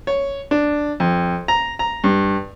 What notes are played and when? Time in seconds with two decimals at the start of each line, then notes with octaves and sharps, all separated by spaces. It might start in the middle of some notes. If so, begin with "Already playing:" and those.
0.07 C#5
0.51 D4
1.00 F2
1.48 A#5
1.79 A#5
2.04 G2